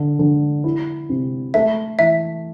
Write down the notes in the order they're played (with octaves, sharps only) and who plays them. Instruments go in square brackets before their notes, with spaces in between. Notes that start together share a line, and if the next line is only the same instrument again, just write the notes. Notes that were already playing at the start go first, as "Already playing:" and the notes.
Already playing: [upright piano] D3
D3
E4
C3
[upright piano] A3 [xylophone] E5
[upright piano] E3 [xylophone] E5